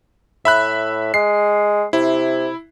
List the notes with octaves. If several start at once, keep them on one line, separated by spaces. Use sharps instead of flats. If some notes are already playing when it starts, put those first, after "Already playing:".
A2 E5 B5 F#6
G#3 C7
C3 E4